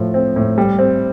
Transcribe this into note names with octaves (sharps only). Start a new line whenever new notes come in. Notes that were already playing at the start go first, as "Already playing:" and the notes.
Already playing: A2 F3
C4
A2
G3
C4